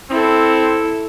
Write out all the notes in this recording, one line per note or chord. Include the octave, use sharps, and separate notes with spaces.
C4 E4 A4